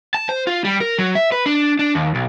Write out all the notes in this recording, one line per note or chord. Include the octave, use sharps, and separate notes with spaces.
A5
C5
F4
G3
A#4
F#3
E5
B4
D4
D4
D#2
B1